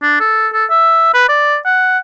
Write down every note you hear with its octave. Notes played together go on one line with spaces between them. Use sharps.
D4
A4
A4
E5
B4
D5
F#5